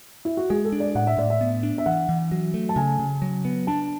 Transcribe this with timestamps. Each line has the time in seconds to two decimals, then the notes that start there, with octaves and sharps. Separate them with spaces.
0.25 E4
0.37 F#4
0.50 G#3 G#4
0.64 A4
0.72 D4
0.80 D5
0.95 A2 F#5
1.07 E5
1.17 A2 D5
1.30 E5
1.41 B3
1.63 D4
1.78 E5
1.86 E3 F#5
2.09 E3
2.32 F#3
2.54 A3
2.69 A5
2.76 C#3 G#5
2.99 C#3
3.22 F#3
3.45 B3
3.67 D4 A5